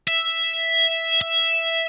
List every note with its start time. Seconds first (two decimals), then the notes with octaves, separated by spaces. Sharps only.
0.08 E5
1.21 E5